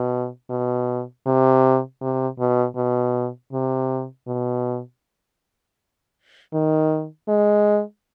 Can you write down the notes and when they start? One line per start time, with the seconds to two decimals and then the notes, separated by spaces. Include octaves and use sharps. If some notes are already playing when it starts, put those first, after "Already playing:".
Already playing: B2
0.50 B2
1.26 C3
2.01 C3
2.39 B2
2.76 B2
3.53 C3
4.27 B2
6.53 D#3
7.28 G#3